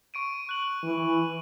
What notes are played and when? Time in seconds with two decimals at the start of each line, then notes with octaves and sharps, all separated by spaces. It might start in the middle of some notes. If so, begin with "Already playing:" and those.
0.14 C#6 D7 D#7
0.49 F#6 F#7
0.83 E3